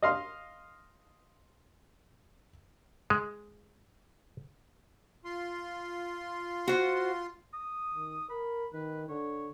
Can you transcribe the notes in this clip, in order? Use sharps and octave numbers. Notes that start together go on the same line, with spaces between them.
D#5 F5 C6
G#3
F4 C6
F#4 C5
D#6
D#3
A#4 B5
D#3 B4
D3 C#5